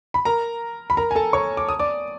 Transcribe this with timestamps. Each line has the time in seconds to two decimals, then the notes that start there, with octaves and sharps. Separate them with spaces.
0.14 B5
0.25 A#4 A#5
0.90 B5
0.97 A#4 A#5
1.11 G#5
1.15 A4 A5
1.33 C#5 C#6
1.57 D6
1.69 D#6
1.79 D5 D6